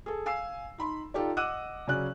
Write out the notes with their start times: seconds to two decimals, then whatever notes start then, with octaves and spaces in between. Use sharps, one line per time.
0.06 G#4 A4
0.26 F5 G#5 E6 C7
0.78 D#4 B5 C6
1.14 D#4 F4 G4 A4 D5
1.37 D#5 F#5 D6 E6 F#6 D#7
1.87 C#3 F#3 C#4 D5 F#6